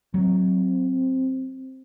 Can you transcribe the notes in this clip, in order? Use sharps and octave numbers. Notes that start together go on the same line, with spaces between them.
F#3 C4